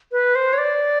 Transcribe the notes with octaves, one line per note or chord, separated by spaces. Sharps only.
B4
C5
C#5
D5